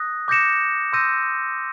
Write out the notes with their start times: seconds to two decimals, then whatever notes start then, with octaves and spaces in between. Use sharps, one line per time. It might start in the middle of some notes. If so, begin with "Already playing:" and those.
Already playing: D#6 F#6 A#6
0.28 D6 G6 A#6 C#7 E7
0.93 C6 E6 G6 A#6 D#7